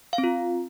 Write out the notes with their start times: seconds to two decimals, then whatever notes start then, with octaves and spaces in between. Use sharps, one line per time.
0.13 F5
0.18 C4
0.24 F4